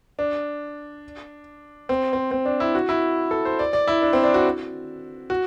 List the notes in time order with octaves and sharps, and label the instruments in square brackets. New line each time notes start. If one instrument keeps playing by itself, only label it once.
[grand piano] D4
C4
C4
C4
D4
E4
F#4
E4
A4
C5
D5
D5
E4
D4
C4
D4
F#4
F#4